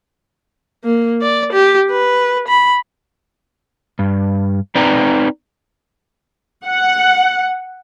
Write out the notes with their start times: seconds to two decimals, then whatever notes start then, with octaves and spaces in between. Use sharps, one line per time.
0.84 A#3
1.22 D5
1.53 G4
1.91 B4
2.48 B5
3.99 G2
4.75 C4 D#4 B4 D5 G5 A#5
6.66 F#5